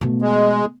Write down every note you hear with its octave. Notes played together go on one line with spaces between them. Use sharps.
B2 A3
G#3